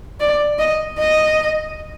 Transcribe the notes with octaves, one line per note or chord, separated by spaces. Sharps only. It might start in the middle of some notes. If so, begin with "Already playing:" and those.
D5
D#5
D#5